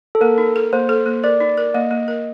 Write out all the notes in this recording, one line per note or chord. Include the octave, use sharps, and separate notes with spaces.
A4
A#3 A#4
D#4
A4
A#3 C5
A4
A#3
A#4 D5
D#4
A#4
A#3 D#5
A#3
A#4